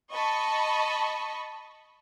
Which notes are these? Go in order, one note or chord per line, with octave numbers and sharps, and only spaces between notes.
D#5 A5 B5 C#6